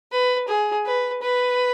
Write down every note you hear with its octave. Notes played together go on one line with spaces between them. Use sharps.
B4
G#4
B4
B4